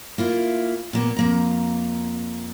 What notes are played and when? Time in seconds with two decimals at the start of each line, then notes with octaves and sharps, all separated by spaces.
0.18 A#3 E4 F4
0.93 A#2 A#3 B3
1.17 F2 A#3 A#5